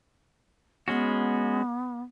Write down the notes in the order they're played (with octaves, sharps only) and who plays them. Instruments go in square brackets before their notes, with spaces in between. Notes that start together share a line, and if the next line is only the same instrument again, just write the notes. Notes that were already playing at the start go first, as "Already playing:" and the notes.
[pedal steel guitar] G#3 C#4 F#4 [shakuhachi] B3